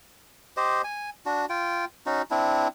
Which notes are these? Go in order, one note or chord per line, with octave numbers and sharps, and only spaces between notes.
G4 C5 D#5
G#5
D4 F#4
F4 G5
C#4 D#4 F#4
C4 D4 E4